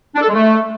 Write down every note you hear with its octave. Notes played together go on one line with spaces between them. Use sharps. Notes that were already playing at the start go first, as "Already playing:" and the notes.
D4
A4
G#3
A3